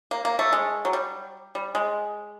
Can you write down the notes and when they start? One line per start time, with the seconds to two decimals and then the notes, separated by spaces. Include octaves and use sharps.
0.11 A#3
0.25 A#3
0.39 A3
0.53 G#3
0.85 F#3
0.93 G3
1.55 G3
1.75 G#3